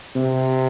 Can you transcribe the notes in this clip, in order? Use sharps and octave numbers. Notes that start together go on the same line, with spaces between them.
C3